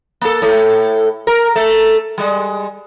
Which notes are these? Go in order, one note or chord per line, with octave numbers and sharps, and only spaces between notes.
A#3 A4
A2 A3
A#4
A3 A4
G3 G#3